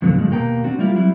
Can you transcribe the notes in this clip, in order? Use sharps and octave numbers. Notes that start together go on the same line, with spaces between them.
F2 B2 D3 F#3 A#3 C4
G2 A#2 D3 F3 G#3
D#2 B2 A#3 G4 G5 A#5
C4 D4 F#4
G3 A#3 E4 F4 G4
F#3 G3 C4 E4